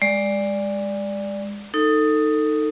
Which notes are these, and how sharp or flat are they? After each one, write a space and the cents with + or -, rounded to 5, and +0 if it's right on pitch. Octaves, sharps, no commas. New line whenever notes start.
G#3 -25 D5 +0
D#4 +0 A4 +20